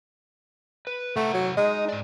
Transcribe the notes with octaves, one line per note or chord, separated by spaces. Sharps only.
B4
C3 A3 F#5 A#5
F#3
G#3 D#4 D#5
G#2 D5